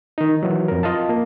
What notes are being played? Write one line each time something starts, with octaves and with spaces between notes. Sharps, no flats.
D#3 D#4
E3 F#3
F2 A#4
F4 D#5 F5 A5
A#3